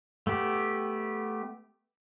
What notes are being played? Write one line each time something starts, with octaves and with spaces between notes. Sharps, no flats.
A3 B3 G4